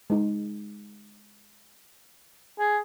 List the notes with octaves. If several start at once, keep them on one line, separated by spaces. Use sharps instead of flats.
G#3 D#4
G#4